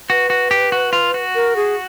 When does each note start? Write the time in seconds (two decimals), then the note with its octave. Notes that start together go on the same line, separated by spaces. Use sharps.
0.10 F#4 B4
0.30 F#4
0.51 G4
0.72 F#4
0.93 F4
1.14 F#4
1.35 A#4
1.56 G#4